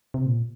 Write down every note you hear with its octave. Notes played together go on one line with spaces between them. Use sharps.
C3
A#2